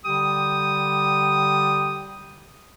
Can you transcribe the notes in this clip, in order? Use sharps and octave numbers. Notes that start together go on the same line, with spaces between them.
D3 G3 G4 G5 D#6